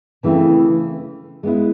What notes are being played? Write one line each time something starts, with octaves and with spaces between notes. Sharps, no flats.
C#3 E3 A3 C4 E4
G#3 B3 E4